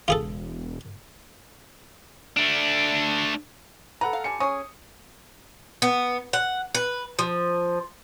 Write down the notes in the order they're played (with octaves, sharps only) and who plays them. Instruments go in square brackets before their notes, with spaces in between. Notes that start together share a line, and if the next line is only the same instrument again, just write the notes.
[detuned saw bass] E1 [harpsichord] F4 G#4 A4
[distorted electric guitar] A3 D4
[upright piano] A4 F#5 A#5 [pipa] B4
[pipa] F5
[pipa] D3 G3 [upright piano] G#5 C#7
[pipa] C#4 G#4 [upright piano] D#6
[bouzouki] B3
F#5
B4
F3